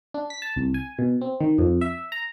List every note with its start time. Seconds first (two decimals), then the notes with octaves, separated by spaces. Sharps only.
0.14 D4
0.30 B6
0.42 A5
0.56 C2
0.74 G#5
0.99 B2
1.21 C4
1.40 D#3
1.58 F2
1.81 E5
2.12 A#5